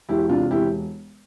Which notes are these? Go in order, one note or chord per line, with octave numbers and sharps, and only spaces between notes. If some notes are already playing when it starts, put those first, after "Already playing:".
E1 E4 G4
C3 D4 F4
E1 E4 G4